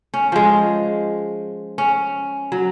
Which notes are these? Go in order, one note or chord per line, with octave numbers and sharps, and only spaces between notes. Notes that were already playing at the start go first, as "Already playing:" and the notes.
C#4
F3 G#3
C#4
F#3